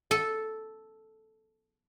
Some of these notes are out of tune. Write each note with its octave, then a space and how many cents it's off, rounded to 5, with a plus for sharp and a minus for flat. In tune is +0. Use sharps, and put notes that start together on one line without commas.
A4 -5